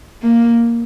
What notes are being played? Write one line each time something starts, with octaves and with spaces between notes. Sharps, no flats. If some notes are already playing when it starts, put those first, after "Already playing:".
A#3